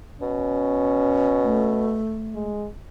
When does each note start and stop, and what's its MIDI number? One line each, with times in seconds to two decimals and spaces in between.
0.22 1.99 47
0.22 1.89 61
1.43 2.48 57
2.35 2.68 56